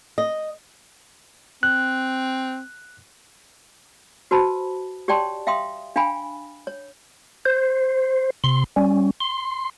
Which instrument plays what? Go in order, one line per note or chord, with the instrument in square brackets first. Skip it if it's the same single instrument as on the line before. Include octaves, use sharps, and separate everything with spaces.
[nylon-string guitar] D#5
[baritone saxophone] C4 [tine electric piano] F#6
[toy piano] F#4 B4 C5 A5 B5
G4 C#5 D5 G5 A5 C6
E5 F5 G5 C6 D#6
D4 F5 G5 G#5 B5
C#5
[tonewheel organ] C5
C3 C6
G3 C#4
C6